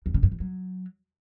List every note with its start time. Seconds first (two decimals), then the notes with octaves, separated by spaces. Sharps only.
0.06 E2
0.14 C#3
0.23 G2
0.32 E3
0.40 F#3